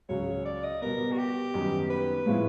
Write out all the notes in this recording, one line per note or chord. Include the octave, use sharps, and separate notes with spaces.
C#2 C#3 F#3 C#5
D5
D#5
B2 G3 B3 A#4
F#4
G4
F#2 D#3 G3 B3 D#4
B4
A2 F3 G#3 B3 E4